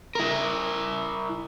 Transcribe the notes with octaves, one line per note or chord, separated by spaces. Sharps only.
E4 A#4